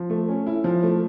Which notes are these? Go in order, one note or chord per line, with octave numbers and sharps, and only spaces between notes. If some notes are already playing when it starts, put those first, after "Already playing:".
Already playing: F3
A3
C#4
E4
F3
A3